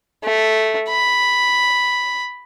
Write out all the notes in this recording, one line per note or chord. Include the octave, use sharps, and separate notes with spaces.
A3
B5